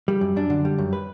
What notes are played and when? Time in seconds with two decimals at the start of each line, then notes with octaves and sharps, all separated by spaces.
0.08 G3
0.21 F#2
0.36 F#2 D4
0.50 D3
0.65 G3
0.78 F#2
0.93 B4